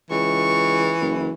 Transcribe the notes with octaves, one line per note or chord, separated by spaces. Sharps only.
C#2 E3 C#6
F#1